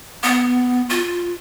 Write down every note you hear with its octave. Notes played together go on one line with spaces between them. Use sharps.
B3
F4